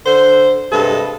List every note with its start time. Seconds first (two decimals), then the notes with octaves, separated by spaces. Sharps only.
0.05 D3 C5
0.71 G2 C3 G#3 A4 B4